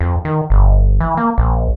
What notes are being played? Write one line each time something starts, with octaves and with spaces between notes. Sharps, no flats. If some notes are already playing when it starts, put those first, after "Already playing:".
F2
D#3
G1
E3
A#3
A#1